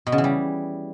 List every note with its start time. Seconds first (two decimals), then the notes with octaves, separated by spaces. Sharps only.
0.07 B2
0.12 C#3
0.18 E3
0.24 G3